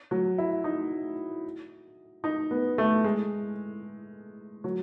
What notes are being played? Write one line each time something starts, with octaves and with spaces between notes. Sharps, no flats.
F#3
E4
D#4
D#4
B3
A3
G#3
F#3